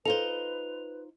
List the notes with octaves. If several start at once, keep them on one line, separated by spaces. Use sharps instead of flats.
D#4 F4 A4 B4 C5 F7